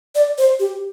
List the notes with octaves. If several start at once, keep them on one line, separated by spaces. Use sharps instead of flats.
D5
C5
G4